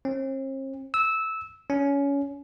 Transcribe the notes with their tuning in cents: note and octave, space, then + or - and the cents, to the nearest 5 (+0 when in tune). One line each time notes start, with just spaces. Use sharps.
C4 +45
E6 -15
C#4 +20